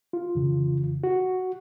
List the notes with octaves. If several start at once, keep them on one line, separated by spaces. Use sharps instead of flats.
F4
F2 C#3 E3
F#4